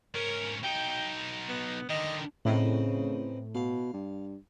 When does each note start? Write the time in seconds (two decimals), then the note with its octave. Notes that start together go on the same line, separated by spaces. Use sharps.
0.15 G#2 C#4 A#4
0.63 B1 D#4 G5
1.49 B3
1.90 D3 D#3 D#5
2.45 A2 C#3 E3 C4 D#4
3.55 B2 F5
3.94 G2